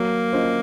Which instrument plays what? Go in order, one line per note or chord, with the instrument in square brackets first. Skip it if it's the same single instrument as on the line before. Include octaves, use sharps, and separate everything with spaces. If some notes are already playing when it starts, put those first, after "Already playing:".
Already playing: [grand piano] F#3 [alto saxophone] A#3
[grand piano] C#4 F4 C5 D#5